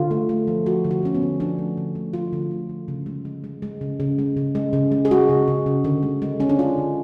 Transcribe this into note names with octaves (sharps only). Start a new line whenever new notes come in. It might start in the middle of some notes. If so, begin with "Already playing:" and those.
Already playing: D3 F4
A3
A3
F3
F3 F#4
D3
F#4
D3 C#4
B3
D3
F3 D4
A3
D3
A3
F3 F4
D3
A3
D3
C#3
G#3
G#3
G#3
G#3
C#3
C#3
G#3
C#3
G#3
C#3
G#3
G#4
G#3 F#4
C#3
C#3
C#3
D3
G#3
G#3
G#3 C#4
D4
G#3 F4
D3